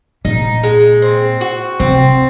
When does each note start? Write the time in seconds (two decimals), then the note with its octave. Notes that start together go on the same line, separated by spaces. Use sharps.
0.25 A#2 D#4
0.63 G#3
1.02 C4
1.41 F#4
1.80 C3 C4